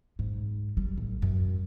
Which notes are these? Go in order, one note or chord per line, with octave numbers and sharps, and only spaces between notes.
G#2
G3
A1
F#2